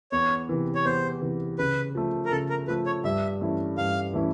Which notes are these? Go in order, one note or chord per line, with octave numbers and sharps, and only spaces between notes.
E2 C#5
C3 E3
C#5
E2 C5
C3 E3
C#3 B4
F3 A3
A#4
C#3 A4
A#4
F3 A3 B4
C#5
G2 E5
E3 A3 C#4 E4
G2 F5
E3 A3 C#4 E4